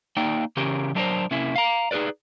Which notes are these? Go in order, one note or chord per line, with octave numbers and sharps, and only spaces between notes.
A#3 D#4 D5 G5
C#3 E3 C#4 G4 A#4
F#3 A3 D4 A4 A#4 C5
C3 A#3 C#4 E4
F5 A#5
D#4 G#4 A#4 B4 D5